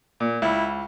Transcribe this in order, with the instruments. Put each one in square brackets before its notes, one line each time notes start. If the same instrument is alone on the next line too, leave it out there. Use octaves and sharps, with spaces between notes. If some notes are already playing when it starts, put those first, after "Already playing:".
[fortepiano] A#2
[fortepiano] C#2 [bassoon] E4